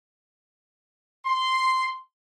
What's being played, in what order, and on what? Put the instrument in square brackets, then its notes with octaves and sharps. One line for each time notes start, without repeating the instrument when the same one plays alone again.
[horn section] C6